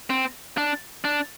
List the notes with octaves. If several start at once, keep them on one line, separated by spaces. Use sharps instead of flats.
C4
D4
D4